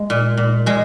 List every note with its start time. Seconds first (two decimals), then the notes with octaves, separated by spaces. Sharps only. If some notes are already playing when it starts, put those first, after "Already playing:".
Already playing: G#3
0.10 A#2
0.37 A#2
0.66 A#2 G#3